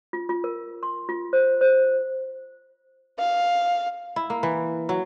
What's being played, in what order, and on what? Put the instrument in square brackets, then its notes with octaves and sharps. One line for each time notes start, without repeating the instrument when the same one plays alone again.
[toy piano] F4
F4
A#4
C6
F4
C5
C5
[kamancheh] F5
[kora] E4
A#3
E3
F#3